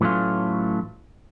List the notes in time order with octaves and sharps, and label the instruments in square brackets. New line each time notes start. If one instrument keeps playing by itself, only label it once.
[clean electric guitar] A2 E3 F#3 A3 C#4 F4